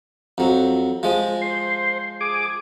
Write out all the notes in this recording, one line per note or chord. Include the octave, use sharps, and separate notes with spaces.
F2 F#3
F3 G#3
C5
G#4 D6